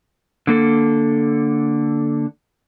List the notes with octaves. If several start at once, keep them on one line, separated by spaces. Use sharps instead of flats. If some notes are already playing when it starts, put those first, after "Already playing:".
D3 A#3 A4